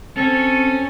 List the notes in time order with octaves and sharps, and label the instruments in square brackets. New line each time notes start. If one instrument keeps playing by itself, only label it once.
[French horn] C4 [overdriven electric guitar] C#4 [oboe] A4